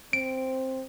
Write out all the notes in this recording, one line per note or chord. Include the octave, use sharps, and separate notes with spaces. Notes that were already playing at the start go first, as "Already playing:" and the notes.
C4 D7